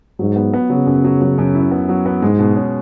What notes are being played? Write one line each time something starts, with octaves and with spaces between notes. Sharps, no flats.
G#2 F#3
B3
B3
C#3 F#3
F#2
F#3
F#3
F#2
E4
B3
F#3
B3
G#2 G#3
B2
C#4